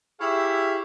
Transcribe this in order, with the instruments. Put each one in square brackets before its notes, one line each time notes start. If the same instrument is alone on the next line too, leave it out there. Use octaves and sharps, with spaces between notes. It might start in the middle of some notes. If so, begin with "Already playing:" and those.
[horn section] E4 G4 G#4 C#5 E5 F5